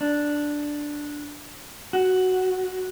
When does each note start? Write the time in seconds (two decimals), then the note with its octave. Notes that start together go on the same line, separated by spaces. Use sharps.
0.01 D4
1.93 F#4